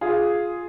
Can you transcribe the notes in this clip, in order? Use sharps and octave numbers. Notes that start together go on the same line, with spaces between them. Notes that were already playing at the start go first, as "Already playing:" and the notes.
F4 G#4